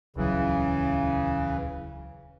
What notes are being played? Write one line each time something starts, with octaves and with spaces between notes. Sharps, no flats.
D#1 C#2 C#3 E3 F#3